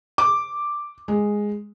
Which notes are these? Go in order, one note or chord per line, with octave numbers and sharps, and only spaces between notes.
D6
G#3